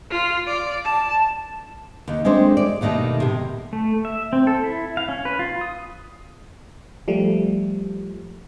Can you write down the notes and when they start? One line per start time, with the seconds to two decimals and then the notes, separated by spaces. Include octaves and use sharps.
0.10 F4
0.47 D5
0.85 A5
2.08 D#2 D#3
2.25 G#3 A3 C4 D4 C5
2.57 D5
2.81 D#2 B2 D#3 G#3 A3
3.20 A2 C3
3.73 A3
4.05 E5
4.33 C4
4.47 A4
4.63 E4
4.97 F5
5.09 C#4
5.25 B4
5.39 F4
5.61 D#6
7.08 F3 G3 A3